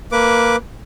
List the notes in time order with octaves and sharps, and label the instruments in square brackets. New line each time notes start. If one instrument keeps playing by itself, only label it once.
[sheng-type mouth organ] A#3 B4 D6